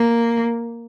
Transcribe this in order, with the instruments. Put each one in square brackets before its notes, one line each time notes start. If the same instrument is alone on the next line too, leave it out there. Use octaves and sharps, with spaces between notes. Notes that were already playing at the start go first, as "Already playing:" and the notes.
Already playing: [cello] A#3